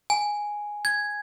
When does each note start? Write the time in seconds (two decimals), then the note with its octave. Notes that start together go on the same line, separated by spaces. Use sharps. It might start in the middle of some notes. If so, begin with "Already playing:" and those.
0.10 G#5
0.85 G#6